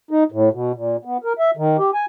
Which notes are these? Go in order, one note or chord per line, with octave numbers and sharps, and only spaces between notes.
D#4
A2
B2
A#2
B3
A#4
E5
D#3
G4
G#5